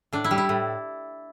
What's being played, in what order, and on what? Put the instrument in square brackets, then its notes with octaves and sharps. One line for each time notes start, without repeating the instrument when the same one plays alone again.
[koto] A2 D4
E4
G3
E4
A2